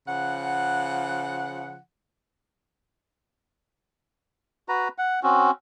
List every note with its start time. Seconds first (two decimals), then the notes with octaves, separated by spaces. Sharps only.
0.07 C#3 F3 F#5
4.69 F#4 B4 A#5
4.98 F#5
5.23 C4 C#4 F#4